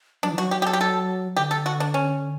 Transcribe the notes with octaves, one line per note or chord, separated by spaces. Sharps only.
F#3 D4
E3
F#3 F#4
G4
G4
A4
G4
A4
D3 G4
A4
F#4
D4
C#4